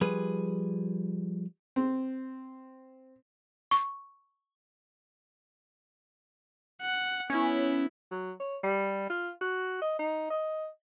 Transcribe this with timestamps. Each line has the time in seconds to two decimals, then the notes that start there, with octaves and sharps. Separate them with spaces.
0.01 F3 G3 G#4 B4
1.76 C4
3.71 C#6
6.81 F#5
7.30 B3 C#4 E4
8.11 F#3
8.40 C#5
8.63 G3
9.10 F4
9.41 F#4
9.82 D#5
9.99 D#4
10.30 D#5